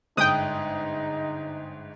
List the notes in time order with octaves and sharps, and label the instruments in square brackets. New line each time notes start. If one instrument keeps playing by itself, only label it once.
[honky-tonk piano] G1 G#2 F#6 [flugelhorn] D#4 [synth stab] G5 D#6